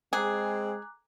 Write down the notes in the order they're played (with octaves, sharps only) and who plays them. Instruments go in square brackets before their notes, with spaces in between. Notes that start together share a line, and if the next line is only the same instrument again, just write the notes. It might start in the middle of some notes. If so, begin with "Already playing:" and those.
[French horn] G#3 [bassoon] C4 [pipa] G#4 [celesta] A#5 D6 F#6